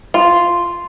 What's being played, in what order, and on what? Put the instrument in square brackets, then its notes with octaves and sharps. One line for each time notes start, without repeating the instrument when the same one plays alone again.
[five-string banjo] F4